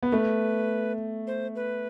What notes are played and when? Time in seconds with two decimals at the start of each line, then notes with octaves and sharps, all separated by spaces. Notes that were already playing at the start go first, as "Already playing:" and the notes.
0.03 B3
0.12 A3 B4
1.27 C5
1.56 B4